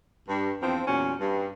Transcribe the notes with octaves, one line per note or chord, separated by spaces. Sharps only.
G2
E2 F3 C4
E2 A#2 F#3 C#4
G2